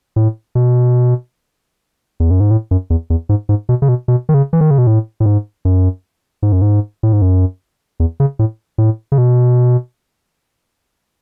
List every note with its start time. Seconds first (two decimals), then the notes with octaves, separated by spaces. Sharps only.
0.16 A2
0.55 B2
2.20 E2
2.31 F#2
2.40 G#2
2.51 A2
2.71 F#2
2.90 E2
3.10 E2
3.29 G#2
3.49 G#2
3.69 B2
3.82 C#3
3.89 B2
4.08 B2
4.29 D#3
4.34 C#3
4.53 E3
4.61 D#3
4.71 C#3
4.78 B2
4.87 A2
5.20 A2
5.26 G#2
5.65 F#2
6.43 G#2
6.52 F#2
6.62 G#2
7.03 A2
7.12 G#2
7.22 F#2
8.00 E2
8.20 C#3
8.39 A2
8.78 A2
9.12 C#3
9.18 B2